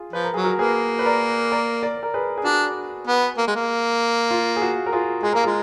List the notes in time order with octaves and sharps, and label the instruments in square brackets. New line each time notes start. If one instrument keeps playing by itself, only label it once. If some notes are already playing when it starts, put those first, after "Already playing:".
Already playing: [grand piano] F4 G#4
[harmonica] F3 [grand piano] B4
[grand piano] A#4
[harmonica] F#3 [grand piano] G#4
[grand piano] F#4 A#4
[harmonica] A#3 [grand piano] G#4 B4
[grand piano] B4
A#4 D5
A#4 D5
A#4 D5
A#4
G#4 B4
G#4
[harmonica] D4 [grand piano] F#4
[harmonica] B3
A#3
G#3
A#3
[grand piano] F4
G#4
F#4
A#4
F4 G#4
[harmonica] G#3 [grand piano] G#4
[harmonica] A#3 [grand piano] A#4
[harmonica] G#3 [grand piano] F4 G#4